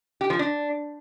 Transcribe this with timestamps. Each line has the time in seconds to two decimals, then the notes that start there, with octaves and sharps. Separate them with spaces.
0.21 G4
0.30 F3
0.39 D4